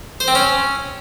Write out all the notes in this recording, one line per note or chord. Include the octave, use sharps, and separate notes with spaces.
C5
C4
C#4